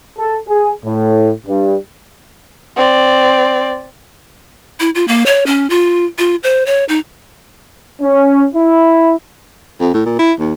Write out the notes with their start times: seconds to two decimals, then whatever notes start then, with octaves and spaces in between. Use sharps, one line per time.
0.19 A4
0.48 G#4
0.84 A2
1.47 G2
2.77 C4 D5
4.80 E4
4.95 F4
5.08 A#3
5.26 C#5
5.46 C#4
5.70 F4
6.18 F4
6.43 C5
6.66 C#5
6.89 D#4
8.02 C#4
8.55 E4
9.81 F2
9.94 A2
10.06 A#2
10.19 E4
10.39 D#2